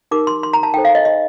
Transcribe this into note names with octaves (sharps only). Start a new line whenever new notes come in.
D#4 G4 A#4 D6
C6
C6
A#5
A5
D#4 A4 C5 G5
F5
D#5
D#5